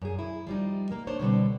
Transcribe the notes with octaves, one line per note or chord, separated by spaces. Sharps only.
F#2 G#4
E4
F3 G3 D#4
A#3 A#4
D4 C5 C#5
B2 D3 G3 C4